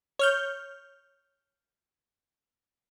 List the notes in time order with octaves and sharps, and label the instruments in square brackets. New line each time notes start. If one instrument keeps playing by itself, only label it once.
[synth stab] C#5 F6 G6